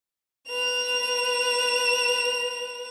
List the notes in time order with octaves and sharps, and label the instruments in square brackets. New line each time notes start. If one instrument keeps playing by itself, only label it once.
[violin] B4 F7